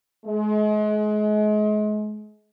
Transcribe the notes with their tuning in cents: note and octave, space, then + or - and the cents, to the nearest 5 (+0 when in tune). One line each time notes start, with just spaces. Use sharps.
G#3 +35